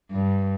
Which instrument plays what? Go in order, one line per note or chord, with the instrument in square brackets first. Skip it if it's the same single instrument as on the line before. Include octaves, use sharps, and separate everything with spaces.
[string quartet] G2